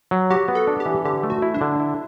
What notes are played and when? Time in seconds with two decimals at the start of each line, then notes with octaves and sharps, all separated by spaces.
0.11 F#3
0.30 F#4 G4
0.48 B3
0.55 A4
0.67 D4
0.80 G4
0.86 E3
1.05 D3 G4
1.23 A3
1.30 F#4
1.42 E4
1.54 D4
1.61 D3
1.80 E4